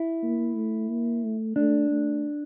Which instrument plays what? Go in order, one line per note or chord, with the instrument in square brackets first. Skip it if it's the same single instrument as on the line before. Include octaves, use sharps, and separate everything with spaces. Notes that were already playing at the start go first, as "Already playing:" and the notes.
Already playing: [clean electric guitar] E4
[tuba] A#3
A3
A#3
A3
[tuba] A3 [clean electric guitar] D4
[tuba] A3